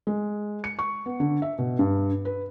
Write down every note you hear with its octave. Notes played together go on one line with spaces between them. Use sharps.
G#3
C#7
C#6
B3
D3
E5
B2
G2
B4